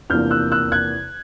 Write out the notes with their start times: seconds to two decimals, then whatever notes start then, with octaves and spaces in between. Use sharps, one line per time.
0.10 E2 C3 F3 A#3 D4 F6 G6
0.31 E6 F#6
0.52 E6 F#6
0.72 F#6 G#6